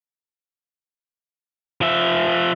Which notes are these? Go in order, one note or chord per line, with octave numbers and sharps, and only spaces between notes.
F3 E5